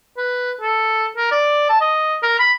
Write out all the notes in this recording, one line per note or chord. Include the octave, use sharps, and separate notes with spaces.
B4
A4
A#4
D5
A5
D#5
A#4
B5